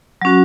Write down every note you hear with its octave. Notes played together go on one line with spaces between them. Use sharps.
F#3 C#4 F#4